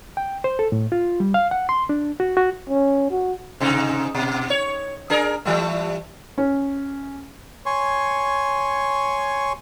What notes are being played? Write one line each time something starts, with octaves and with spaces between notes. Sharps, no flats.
G5
C5
A4
A2
F4
G3
F5
F#5
C6
D4
F#4
F#4
C#4
F#4
G#2 C3 D#4
B2
C#5
D4 G#4 A#4
E3 G3 A3
C#4
C#5 G#5 C6 C#6